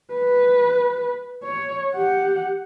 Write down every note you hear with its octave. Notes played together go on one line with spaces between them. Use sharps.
B4
C#5
G4 F#5